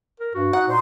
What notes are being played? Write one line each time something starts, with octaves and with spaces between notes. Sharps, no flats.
A#4
G2 F#4
D#4 F#5 F#6
A#2 D#4 C5